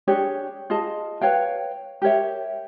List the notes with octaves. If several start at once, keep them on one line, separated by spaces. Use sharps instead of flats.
D4 G4 G#4 C#5
F4 G#4 D#5 A5
B4 C#5 F5 G5
G4 A#4 C#5 E5